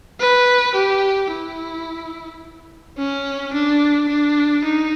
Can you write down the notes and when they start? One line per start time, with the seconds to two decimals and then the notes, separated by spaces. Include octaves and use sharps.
0.20 B4
0.75 G4
1.31 E4
2.97 C#4
3.53 D4
4.09 D4
4.64 D#4